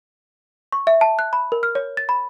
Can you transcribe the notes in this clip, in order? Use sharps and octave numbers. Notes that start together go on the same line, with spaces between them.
C#6
E5
A5
F#6
B5
A#4
F6
C#5
A6
B5